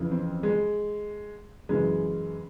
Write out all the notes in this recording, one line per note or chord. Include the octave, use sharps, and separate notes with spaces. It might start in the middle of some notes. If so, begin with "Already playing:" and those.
Already playing: F2 C#3 E3
C4
G#3
F#2 C#3 E3 G#3